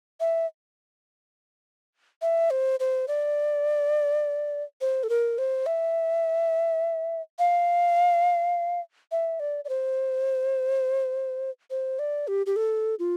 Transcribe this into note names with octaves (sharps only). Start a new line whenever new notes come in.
E5
E5
C5
C5
D5
C5
A4
A#4
C5
E5
F5
E5
D5
D5
C5
C5
D5
G4
G4
A4
F4